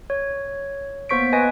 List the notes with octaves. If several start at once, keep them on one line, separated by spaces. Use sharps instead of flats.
C#5
A#3 B3 C5 C#6 B6 D7
B4 D#5 G#5 C#6